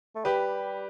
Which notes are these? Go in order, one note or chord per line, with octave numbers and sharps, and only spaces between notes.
A3
G3 G4 B4